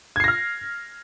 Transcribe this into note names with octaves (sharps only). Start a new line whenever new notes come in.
F6 G#6 A#6 C7